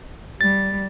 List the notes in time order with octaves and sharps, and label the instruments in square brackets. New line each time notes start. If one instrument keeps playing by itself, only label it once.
[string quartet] G3 [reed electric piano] A6